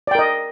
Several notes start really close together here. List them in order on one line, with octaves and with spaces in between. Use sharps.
D5 G5 A#4 D#5